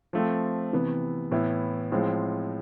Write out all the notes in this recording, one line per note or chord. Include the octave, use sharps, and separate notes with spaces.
F3 A3 C4
C3 E3 B3
A2 E3 B3 E4
A2 F3 G#3 C4